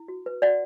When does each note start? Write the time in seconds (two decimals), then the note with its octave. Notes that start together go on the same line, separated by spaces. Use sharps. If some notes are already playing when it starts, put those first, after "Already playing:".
Already playing: E4
0.08 F#4
0.26 B4
0.42 F#4 D5 F#5